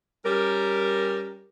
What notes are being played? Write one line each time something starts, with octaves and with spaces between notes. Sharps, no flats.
G3 C#4 G4 A#4